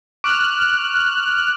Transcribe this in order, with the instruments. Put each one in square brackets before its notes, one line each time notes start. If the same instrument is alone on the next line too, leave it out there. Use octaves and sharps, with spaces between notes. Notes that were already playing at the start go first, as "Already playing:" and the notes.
[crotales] C#6 D6 D7 [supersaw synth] F6 F#6